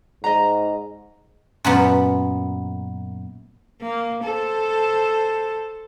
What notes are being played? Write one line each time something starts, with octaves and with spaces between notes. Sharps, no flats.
G#2 D#5 A#5
F#2 A#2 B3
A#3
A4 C5